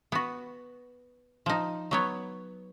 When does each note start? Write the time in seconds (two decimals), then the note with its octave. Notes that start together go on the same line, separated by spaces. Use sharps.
0.12 B3 F#4
1.46 F3 D#4
1.91 F#3 B3 C#5